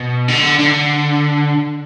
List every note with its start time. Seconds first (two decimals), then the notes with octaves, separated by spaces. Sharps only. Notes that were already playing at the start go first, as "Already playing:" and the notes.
Already playing: B2
0.29 D3
0.60 D3